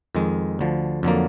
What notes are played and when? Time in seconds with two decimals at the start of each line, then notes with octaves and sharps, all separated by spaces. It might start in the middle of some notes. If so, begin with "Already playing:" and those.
0.15 F2 D#3 G#3
0.59 D2 D3 F3
1.03 F2 D3 F#3 A#3